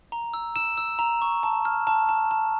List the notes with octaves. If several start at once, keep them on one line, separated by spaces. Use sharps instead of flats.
A#5
E6
E6 E7
E6
A#5
C#6
A5
F6
A5
A5
A5